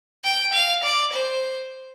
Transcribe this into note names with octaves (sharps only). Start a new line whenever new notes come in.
G5
F5
D5
C5